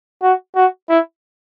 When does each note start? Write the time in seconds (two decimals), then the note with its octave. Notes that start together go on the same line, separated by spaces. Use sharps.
0.22 F#4
0.55 F#4
0.89 E4